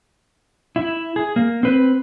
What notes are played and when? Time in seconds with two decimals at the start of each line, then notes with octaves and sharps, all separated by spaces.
0.76 E4
1.16 G#4
1.36 A#3
1.63 C4 B4